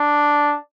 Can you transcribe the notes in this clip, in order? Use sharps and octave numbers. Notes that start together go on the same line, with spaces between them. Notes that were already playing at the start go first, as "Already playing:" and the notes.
Already playing: D4